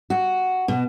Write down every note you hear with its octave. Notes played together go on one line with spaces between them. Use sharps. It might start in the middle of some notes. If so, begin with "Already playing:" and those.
F#4
B2